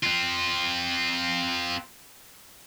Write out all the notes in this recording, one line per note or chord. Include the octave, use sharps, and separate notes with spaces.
C4 F4